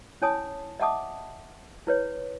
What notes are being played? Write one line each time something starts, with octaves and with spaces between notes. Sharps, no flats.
C#4 E4 C#5 G#5 A5 D#6
D#5 E5 F#5 A5 D6 D#6
E4 B4 C#5